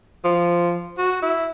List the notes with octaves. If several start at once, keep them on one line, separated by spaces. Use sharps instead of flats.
F3
F#4
E4